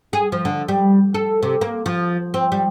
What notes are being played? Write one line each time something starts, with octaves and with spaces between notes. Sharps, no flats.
G#4
F3
D3
G3
A4
C3
A#3
F3
C4
G3